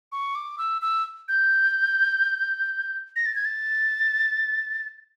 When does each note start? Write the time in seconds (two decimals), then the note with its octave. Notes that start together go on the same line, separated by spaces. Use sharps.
0.12 C#6
0.35 D6
0.58 E6
0.82 E6
1.28 G6
3.16 A#6
3.26 A6
3.36 G#6
3.45 A6